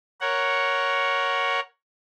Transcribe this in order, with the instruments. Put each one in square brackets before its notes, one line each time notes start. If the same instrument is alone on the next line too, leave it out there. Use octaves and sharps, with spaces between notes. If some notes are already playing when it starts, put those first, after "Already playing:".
[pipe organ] A#4 C#5 F#5